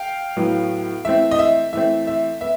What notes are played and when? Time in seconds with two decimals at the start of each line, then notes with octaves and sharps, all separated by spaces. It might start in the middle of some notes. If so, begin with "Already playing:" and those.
Already playing: F5 G5
0.37 A2 F#3 B3
1.05 E3 A3 C4 E5
1.31 D#5
1.39 E5
1.73 E3 A3 C4 E5
2.07 E5
2.41 B3 E5